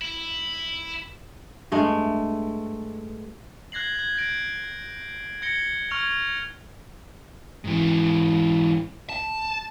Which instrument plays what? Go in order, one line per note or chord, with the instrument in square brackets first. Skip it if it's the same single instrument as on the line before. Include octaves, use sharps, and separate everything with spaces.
[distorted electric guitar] E4
[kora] G2 G#3 A3
[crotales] F#6 G#6 A#6 C7 F#7
F#6 G#6
G6 A#6 D7
G#6 A#6 C#7 G7
C#6 F6 G#6 F7
[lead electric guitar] G#2 E3
A5